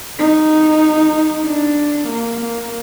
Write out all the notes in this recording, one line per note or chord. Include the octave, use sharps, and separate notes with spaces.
D#4
D4
A#3
A#3